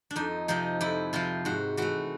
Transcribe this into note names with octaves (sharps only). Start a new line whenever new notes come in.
D4
F2 D#4
C3 F3 D#4
F2 E4
C3 F3 F4
G#2 F#4
E3 A3 F#4